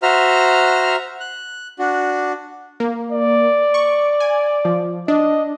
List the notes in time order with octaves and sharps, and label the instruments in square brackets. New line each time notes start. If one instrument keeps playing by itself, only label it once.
[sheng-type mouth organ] F#4 C5 E5 A#5 F6
F#6
D4 F#4
[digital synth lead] A#3
[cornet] D5
[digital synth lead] C#6
G#5
F3
[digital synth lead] D4 [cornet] D#5